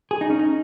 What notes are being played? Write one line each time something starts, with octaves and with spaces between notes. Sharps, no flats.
G#4
D#4
C#4
D#4